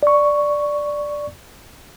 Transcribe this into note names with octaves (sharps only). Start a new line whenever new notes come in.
D5 C#6